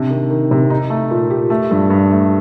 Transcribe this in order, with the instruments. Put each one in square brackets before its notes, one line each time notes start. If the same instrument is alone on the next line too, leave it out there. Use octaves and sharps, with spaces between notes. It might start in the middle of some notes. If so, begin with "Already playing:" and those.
Already playing: [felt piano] C3 D4
D#3
D#3
C3
D#4
A3
A#2
G4
A3
G2
G2
A3